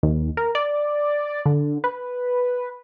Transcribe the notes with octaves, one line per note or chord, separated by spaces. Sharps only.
D#2
A#4
D5
D3
B4